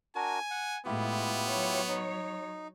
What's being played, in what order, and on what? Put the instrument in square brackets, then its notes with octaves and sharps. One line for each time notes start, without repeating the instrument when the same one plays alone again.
[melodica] D4 F#4 A#4 [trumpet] G#5
[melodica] F#5
[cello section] A2 G#3 [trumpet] B3 [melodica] E4 F4 G4
[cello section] F#3 C#5
[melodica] D#4